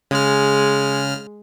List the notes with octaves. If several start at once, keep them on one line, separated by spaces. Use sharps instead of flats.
C#3 G#3 F6